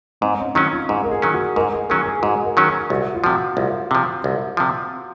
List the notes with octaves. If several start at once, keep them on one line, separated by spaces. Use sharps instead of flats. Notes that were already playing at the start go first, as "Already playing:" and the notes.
G#2 C4
C#4
D#3 F#3 C#4 D#4
F4
G#2 G#4
A#4
G#4
D#3 F#3 C#4
F#4
G#2 A#4
G#4
D#3 F#3 C#4 G#4
G#4
G#2 F#4
A#4
D#3 F#3 C#4
G#4
C2 F#4
F4
C3 F3 F#4
C2 F4
C3 F3
C2
C3 F3